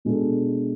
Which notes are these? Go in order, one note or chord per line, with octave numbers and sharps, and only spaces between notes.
B2 G#3 D4 A4